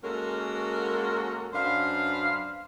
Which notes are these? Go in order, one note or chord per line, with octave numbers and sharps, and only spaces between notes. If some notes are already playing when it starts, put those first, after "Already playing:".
G#3 A#3 C#4 F#4 A4 A#4
F#2 D4 B4 C5 F5